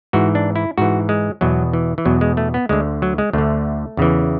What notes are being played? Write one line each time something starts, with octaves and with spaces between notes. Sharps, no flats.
G#2 E3 F#4
D4
E4
G#2 E3 F#4
G#3
E2 B2 F#3
E3
E3
E2 B2 F#3
G#3
A3
B3
D2 D3 G#3
F#3
G#3
D2 D3 A3
E2 C#3 E3